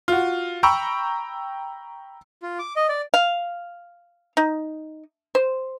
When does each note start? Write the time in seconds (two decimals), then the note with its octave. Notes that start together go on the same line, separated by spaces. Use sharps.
0.08 F4 F#4
0.63 G5 A#5 B5 C#6 E6
2.42 F4
2.59 D6
2.76 D#5
2.89 D5
3.14 F5
4.37 D#4
5.35 C5